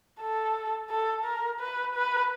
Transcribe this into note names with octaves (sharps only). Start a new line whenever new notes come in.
A4
A4
A#4
B4
B4